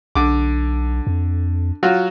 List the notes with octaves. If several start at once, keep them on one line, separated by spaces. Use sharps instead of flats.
B1 D3 D6
F2
F#3 F4 F#4